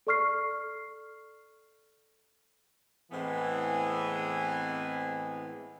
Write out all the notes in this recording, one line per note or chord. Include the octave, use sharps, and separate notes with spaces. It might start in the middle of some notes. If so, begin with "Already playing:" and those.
A4 D5 C#6 F6 C7
A2 E3 G#3 B3 C4 G#4